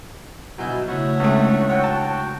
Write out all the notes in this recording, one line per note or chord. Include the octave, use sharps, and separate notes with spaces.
B2 F#3 E4 G#5 G6
C#3 A3 E4 C#5 E5 F#5
C#2 G#3 A3 C#6 E6
F#4 C#5 F#5 G5
A5